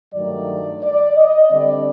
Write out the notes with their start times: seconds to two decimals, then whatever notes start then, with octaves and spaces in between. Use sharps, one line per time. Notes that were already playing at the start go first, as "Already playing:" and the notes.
0.14 G2 D#3 F#3 A3 D5
0.83 D5
1.16 D#5
1.51 D3 G3 C4 D5